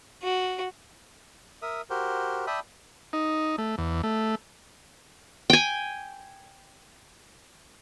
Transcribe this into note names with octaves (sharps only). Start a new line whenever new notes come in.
F#4
A#4 E5 D#6
F#4 G4 A#4 C5
D5 E5 G5 A5 B5 D#6
D#4
A3
E2
A3
G5 G#5